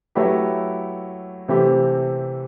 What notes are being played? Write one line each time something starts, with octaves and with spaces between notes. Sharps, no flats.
F#3 A3 E4 G4 B4
C3 E3 A3 C4 G4